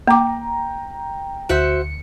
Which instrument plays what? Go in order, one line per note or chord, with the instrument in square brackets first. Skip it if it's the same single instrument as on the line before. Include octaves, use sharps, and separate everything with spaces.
[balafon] A#3 D6 [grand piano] G5 A#5
[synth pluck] D2 C#7 [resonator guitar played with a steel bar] F#4 C5 E5